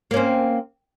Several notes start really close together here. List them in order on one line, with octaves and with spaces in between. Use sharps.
A#3 C#4 C4